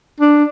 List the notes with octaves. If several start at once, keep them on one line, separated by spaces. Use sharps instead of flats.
D4